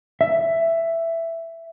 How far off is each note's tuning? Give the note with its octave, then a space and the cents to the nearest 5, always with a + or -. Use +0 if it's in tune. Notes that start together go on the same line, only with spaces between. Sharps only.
E5 +10